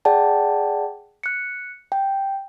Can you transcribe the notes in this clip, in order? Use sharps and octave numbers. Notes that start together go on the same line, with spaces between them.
G#4 D5 F#5 G5 A5
F#6 C#7
G5